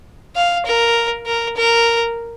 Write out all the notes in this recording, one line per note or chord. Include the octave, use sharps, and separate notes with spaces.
F5
A#4
A#4
A#4